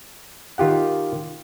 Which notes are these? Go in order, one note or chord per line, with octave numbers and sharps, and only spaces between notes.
D#3 F4 G4 F#5